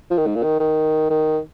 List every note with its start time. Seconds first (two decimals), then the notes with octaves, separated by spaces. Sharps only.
0.10 F3
0.18 D#3
0.27 G#2
0.35 A#2
0.43 D#3
0.60 D#3
1.10 D#3